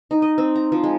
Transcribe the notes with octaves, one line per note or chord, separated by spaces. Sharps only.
D#4
D#5
C4
A#5
F3
G#3